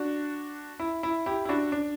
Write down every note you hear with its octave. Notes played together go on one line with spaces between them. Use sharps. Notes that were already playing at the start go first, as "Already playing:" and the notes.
Already playing: D4 F#4
E4
E4
E4 G4
E4
D4 F#4
D4